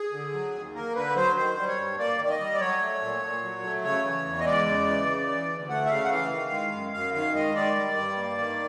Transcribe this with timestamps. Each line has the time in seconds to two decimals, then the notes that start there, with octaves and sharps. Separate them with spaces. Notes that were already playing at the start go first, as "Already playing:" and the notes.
Already playing: G#4
0.12 D3
0.34 F#3
0.54 D#2
0.74 A#3 A#4
0.95 D3 B4
1.16 F#3 C5
1.36 D#3 C5
1.57 G3
1.68 C#5
1.78 G2
1.98 A#3 D5
2.19 D#3
2.24 D5
2.29 D#5
2.40 G3
2.55 D5
2.60 F#3 C#5
2.81 A3
3.01 A#2
3.22 A#2
3.43 F#3
3.63 A3
3.84 C#3 C#5
4.05 E3
4.25 E2
4.40 D#5
4.46 G#3 D5
4.66 C#3
4.87 E3
5.08 C#3
5.28 E3
5.50 D2
5.69 A3 F#5
5.86 E5
5.90 C#3 F5
6.05 F#5
6.11 E3 F5
6.32 D#3
6.52 G#3
6.73 F#2
6.93 F#2 F5
7.14 D#3 F5
7.35 G#3 D#5
7.55 D#3 D5
7.76 G3
7.97 G2
8.17 A#3
8.38 D#3